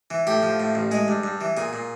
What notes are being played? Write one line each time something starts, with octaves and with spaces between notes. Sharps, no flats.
E3
A2 G4
F3
A2
A1
G#3 G#4
G2
G2
E3
A#2 G#4
A#2